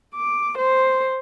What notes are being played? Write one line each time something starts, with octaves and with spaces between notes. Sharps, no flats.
D6
C5